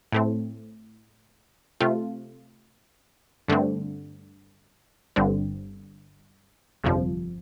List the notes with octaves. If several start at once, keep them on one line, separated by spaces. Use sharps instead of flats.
A2 A3 C4
C3 A3 C4 F4
G2 D3 A3 C4
G1 G2 D3 G3 C4
G1 F2 C3 F3